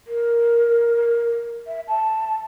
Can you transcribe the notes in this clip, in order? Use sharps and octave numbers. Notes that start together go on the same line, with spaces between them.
A#4
E5
A5